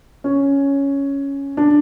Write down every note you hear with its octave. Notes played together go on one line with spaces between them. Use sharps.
C#4
D4